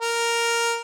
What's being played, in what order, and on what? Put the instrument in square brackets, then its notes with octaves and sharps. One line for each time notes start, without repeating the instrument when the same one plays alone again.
[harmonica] A#4